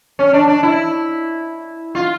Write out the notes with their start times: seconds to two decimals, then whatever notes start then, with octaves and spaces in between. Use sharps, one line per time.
0.19 C#4
0.33 D4
0.48 D4
0.63 E4
1.95 F4